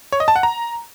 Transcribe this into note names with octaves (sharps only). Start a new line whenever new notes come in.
C#5
D#5
A5
F#5
A#5